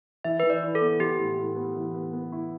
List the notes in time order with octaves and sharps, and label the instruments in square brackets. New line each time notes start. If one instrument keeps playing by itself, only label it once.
[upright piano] E3 [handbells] E5
[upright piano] E3 [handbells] B4
[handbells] D5
[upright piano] E4
[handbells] A4
[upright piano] B3
[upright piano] E3 [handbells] G4
[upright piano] A2
A2
B3
E3
B3
B3
E4